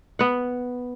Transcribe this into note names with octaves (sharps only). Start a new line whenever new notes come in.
B3 F#5